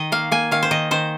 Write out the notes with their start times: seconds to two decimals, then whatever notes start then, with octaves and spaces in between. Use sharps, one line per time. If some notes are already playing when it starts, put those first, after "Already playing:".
Already playing: D#3 D#5
0.12 A#3 F5
0.31 A#3 G#5
0.51 D#3 F5
0.63 C5
0.71 D#3 D#5
0.91 D#3 C5